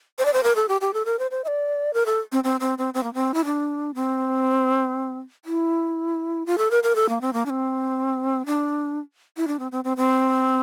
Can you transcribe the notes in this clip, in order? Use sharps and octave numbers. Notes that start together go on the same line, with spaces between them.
C5
D5
C5
A#4
A4
G4
G4
A4
A#4
C5
C5
E5
D5
A#4
A4
C4
C4
C4
C4
C4
A#3
C4
E4
D4
C4
E4
F4
A4
A#4
A#4
A4
A#3
C4
A#3
D4
C4
D4
E4
D4
C4
C4
C4
C4